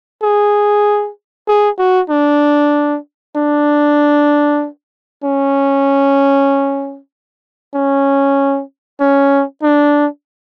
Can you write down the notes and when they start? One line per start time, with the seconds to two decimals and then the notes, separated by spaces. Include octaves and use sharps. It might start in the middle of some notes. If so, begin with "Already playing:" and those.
0.22 G#4
1.48 G#4
1.79 F#4
2.10 D4
3.36 D4
5.24 C#4
7.75 C#4
9.00 C#4
9.63 D4